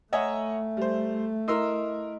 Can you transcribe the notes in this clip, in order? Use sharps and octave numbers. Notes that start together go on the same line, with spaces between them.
A3 C#5 D#5 E5 F#5 G#5 A#5
G3 C5
E4 A#4 D#5 C6 E6